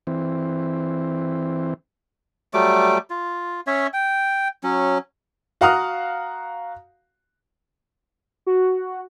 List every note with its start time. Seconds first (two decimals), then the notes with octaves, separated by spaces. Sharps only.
0.07 E3 C4
2.54 F#3 G3 A3 D6
3.10 F4
3.67 C#4 C#5 E5
3.93 G5
4.63 F#3 C#4
5.61 F#4 F5 F#5 A#5 D#6 F6
8.47 F#4